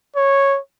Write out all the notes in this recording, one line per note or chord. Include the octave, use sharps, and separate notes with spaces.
C#5